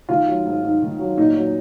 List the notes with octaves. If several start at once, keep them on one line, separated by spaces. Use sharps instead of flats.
D#3 F4
F#3
G#2
G#2
D#3
F#3
A#2 D#4
F#3